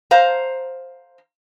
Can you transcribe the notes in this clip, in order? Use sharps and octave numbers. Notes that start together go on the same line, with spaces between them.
C5 F5 A#5